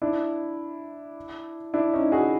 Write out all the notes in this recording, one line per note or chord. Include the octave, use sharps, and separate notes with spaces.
D4 E4
D4 E4
C#4 D#4
F#4 G#4